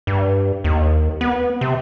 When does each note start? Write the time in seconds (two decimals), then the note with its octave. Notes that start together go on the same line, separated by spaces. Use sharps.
0.07 G2
0.64 D#2
1.21 B3
1.61 C3